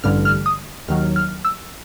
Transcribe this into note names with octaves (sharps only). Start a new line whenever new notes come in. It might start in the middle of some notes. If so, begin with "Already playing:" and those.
A1 G2 D3 G3 F6
F6
D#6
D#2 D#3 F#3 F6
F6
E6